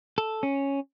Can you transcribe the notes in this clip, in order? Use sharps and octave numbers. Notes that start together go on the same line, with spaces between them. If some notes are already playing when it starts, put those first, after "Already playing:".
A4
C#4